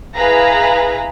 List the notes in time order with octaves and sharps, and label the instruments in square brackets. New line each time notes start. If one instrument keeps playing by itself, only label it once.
[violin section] E4 G#4 B4 F5 A#5